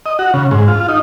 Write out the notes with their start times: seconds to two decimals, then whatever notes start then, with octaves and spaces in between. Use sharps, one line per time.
0.06 D#5
0.19 F#4
0.34 C#3
0.51 G#2
0.68 F4
0.89 D#4